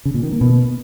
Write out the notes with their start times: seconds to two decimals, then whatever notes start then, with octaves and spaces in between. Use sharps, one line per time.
0.05 C#3
0.14 A#2
0.23 D#3
0.32 A#3
0.41 B2